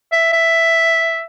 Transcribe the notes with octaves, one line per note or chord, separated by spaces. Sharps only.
E5
E5